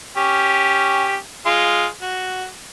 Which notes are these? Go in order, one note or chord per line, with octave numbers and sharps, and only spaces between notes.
C#4 G4
G#3 F4 C6
F#4